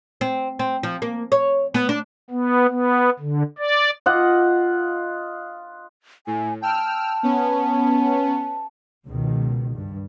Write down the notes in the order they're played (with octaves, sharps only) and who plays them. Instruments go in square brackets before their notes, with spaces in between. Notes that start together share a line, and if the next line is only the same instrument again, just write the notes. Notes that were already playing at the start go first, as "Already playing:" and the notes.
[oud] C4
C4
F3
A#3
C#5
B3
D4
[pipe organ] B3
B3
D3
D5
[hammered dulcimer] F4 D#5 F#5
[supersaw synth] A2 [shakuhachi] G#5
[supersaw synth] G5 E6 F6 [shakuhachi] A5
[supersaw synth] B3 C#4
[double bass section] C#2 B2 D#3
G2